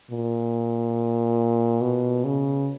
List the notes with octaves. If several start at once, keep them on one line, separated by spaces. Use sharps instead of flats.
A#2
B2
C#3